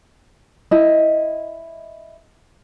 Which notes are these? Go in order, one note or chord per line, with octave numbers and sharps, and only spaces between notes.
E4 D#5